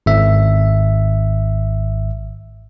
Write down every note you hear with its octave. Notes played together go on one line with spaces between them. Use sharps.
G#1 E5